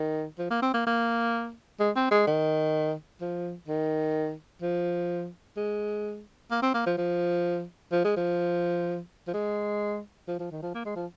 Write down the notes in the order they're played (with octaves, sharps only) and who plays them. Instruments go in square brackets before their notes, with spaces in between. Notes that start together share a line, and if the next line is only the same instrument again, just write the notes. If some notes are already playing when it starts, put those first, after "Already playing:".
Already playing: [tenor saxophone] D#3
F3
A#3
C4
A#3
A#3
G#3
C4
G#3
D#3
F3
D#3
F3
G#3
A#3
C4
A#3
F3
F3
F3
G#3
F3
F3
G#3
F3
F3
D#3
F3
A#3
G#3
F3